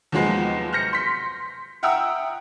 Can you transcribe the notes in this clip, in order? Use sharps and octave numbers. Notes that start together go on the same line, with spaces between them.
D#2 F3 F#3 G#3 B3
F6 G6 A#6 C#7
C6 B6
E5 F#5 G5 A#5 D#6 E6